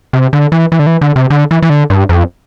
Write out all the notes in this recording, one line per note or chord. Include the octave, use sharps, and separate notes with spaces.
C3
D3
E3
E3
D3
E3
D3
C3
D3
E3
E3
D3
G2
F2